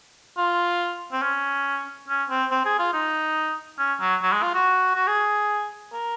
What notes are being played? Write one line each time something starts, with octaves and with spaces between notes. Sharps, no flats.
F4
C4
C#4
C#4
C4
C4
G#4
F4
D#4
C#4
F#3
F#3
G#3
F4
F#4
F#4
G#4
A#4